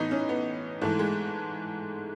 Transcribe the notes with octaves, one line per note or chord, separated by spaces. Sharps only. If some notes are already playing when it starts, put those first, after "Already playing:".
Already playing: A2 E3 B3 D#4
C#4
B3
G#2 E3 A3
G#3